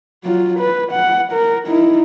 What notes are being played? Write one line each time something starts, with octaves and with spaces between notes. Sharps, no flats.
F#3 F4
B4
F#5
A#4
D#4 E4